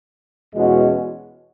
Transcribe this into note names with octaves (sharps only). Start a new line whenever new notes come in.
E2 B2 G#3 C#4 F#4